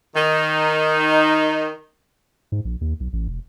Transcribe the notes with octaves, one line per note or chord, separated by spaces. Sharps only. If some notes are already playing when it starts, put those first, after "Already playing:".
D#3 D#4
G#2
A#1
D#2
B1
A1
E1